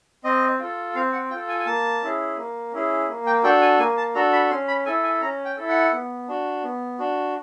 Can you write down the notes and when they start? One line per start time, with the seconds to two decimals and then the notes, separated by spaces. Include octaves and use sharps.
0.24 C4 D#5
0.59 F4 A4
0.95 C4 F5
1.13 F#5
1.30 F4 A4 G5
1.48 G#5
1.59 G#5
1.66 A#3 A5
2.02 C#4 E4 G#4
2.37 A#3
2.72 C#4 E4 G#4
3.08 A#3
3.26 G5
3.44 D4 F#4 A4 G5
3.61 G#5
3.79 A#3 G#5
3.97 A5
4.15 D4 F#4 A4 A#5
4.32 B5
4.50 C#4 C6
4.68 B5
4.86 E4 A4 G#5
5.03 G#5
5.21 C#4 A#5
5.45 G5
5.57 E4 A4
5.69 F#5
5.92 B3
6.28 D4 F#4
6.63 B3
6.99 D4 F#4